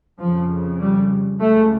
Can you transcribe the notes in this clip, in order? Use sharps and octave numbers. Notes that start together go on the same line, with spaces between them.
F2 C#3 F3
G3
C#2 C#3 A3